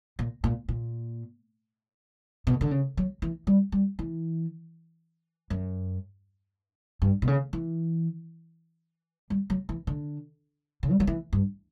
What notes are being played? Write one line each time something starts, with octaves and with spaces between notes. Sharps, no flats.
A#2
A#2
A#2
B2
D3
C#3
F#3
E3
G3
G3
E3
F#2
G2
B2
C#3
E3
G3
F#3
E3
D3
C#3
G3
F#3
E3
G2